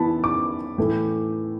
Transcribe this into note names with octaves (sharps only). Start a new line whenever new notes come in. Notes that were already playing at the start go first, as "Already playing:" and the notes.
Already playing: E3 B3 E4 A5 B5
D6
A2 E3 A3